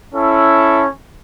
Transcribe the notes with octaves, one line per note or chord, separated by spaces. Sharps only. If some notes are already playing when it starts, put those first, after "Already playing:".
C#4 E4 A4